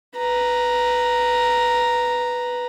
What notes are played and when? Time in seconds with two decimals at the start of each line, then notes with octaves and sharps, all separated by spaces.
0.18 B4 A#5